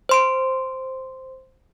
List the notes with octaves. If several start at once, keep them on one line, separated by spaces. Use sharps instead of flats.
C5 C6 D7